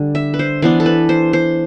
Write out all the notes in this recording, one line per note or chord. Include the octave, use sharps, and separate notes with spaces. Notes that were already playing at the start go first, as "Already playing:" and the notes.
Already playing: D3 G3 D4
E5
B4
C5
E3 B3 D4 C5
A4
B4
C5
C5